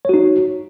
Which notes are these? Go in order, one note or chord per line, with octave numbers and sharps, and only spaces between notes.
D#4 F#4 C#5